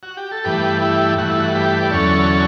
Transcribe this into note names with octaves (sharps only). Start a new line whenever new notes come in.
F#4
G4
A4
G2 E3 A3 G4 B4
E4 G4
G2 E3 A3 F#4
E4
F#4
G4 B4
D5
E2 D3 F#3 C#4 A4 C#5